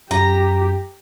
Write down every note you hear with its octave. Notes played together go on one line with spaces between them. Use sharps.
F#2 G4 A#5